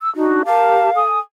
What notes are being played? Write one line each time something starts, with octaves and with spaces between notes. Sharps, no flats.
E6
D4 D#4 F#4
G4 A#4 F5 A5
A4 G#5 D#6